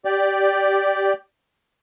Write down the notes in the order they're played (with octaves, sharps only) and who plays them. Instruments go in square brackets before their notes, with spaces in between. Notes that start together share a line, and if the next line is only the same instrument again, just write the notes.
[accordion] G4 D5